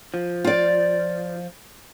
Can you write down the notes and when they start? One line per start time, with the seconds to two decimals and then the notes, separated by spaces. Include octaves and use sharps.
0.14 F3
0.44 F4 D5